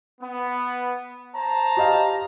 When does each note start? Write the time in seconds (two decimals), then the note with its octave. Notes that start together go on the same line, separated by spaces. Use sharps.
0.20 B3
1.33 C5 A5 A#5
1.77 G4 D#5 F5